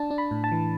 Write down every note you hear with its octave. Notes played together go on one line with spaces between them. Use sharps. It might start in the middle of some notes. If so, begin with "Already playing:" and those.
Already playing: D4 A5
D4
B5
A2
A5
E3